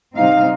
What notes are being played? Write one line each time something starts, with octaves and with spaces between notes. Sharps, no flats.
C3 G3 C4 D#4 F5